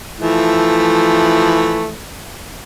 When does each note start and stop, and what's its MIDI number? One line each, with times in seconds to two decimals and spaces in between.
0.20 1.93 52
0.20 1.93 53
0.20 1.93 57